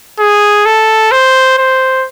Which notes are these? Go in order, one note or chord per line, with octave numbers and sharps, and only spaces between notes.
G#4
A4
C5
C5